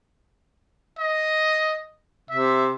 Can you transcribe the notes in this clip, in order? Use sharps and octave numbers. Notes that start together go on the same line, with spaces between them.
D#5
C3 E5